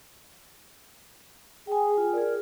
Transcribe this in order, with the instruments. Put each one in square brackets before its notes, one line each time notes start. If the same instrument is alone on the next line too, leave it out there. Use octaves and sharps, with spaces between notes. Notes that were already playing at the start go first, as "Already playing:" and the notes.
[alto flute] G#4 [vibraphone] G5 G#5
[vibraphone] F4
[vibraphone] G#4 D5 [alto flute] A#4